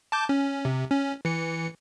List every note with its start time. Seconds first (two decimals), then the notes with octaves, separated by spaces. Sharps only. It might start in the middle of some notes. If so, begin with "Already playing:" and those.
0.12 A5 D6 G6
0.29 C#4
0.65 C3
0.91 C#4
1.25 E3 C#7